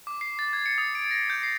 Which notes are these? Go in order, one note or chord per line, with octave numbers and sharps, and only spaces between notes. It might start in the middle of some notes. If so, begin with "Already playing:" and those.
D6
C7
A6
G#6
C#7
D#6
D7
A#6
G6
C7